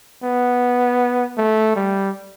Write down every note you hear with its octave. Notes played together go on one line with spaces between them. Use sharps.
B3
A3
G3